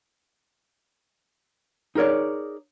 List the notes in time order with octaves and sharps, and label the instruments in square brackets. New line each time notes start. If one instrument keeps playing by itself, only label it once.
[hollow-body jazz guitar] D#4 G#4 A#4 C#5 D5